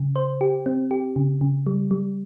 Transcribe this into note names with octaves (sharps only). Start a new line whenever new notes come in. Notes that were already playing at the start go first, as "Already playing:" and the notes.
Already playing: C#3
C5
G4
C4
G4
C#3
C#3
G3
G3